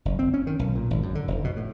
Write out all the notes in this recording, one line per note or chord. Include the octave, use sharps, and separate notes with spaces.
F#1
C4
C#4
D#3
B1
A#2
G#1
F#2
D3
F1
B2
A2